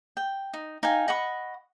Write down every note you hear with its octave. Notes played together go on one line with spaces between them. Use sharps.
G5
D#4
D#4 F5 G5 G#5
D#5 F#5 B5 C#6